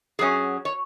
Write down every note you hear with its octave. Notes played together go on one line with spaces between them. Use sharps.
F#2 F#3 C#4 G#4
C#5